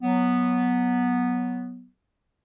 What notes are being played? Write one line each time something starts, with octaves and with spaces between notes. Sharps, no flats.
F#3 B3